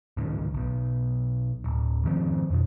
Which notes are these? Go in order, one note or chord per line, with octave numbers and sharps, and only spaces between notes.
C#2 G#2 D3 D#3
B1 B2
D1
G#2 D#3 F3 C4
F2 B2